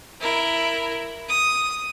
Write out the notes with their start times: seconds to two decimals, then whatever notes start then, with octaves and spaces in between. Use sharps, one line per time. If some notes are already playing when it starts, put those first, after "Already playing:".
0.21 E4 A#4
1.28 D#6